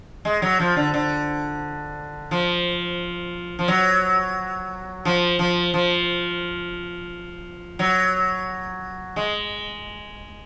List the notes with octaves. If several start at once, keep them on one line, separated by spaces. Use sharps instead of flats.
G#3
F#3
F3
D3
D3
F3
F3
F#3
F3
F3
F3
F#3
G#3